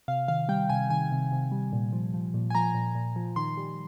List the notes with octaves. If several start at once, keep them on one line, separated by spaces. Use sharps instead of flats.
C3 F5
D#3 F5
G3 G5
C3 G#5
D#3 G#5
C3
C3
G3
A#2
F3
F3
A#2
G#5
F3 A#5
A#2
A#2
F3
D#3 C6
G3